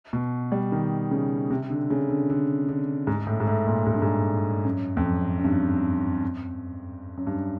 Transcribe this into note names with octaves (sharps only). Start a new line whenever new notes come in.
B2
G3
D#3
C#3
C3
D3
C#3
D3
D3
D3
G#2
A2
G#2
A2
A#2
G#2
G2
G#2
F#2
F2
F#2
F#2
G2
F#2
G2